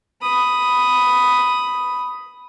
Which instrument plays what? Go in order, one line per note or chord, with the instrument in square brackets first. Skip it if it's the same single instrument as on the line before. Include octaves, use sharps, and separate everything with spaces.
[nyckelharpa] B5 D#6